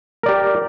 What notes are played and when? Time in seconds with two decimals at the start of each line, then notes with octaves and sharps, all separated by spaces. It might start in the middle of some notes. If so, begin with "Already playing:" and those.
0.23 A#4
0.26 D5
0.29 G4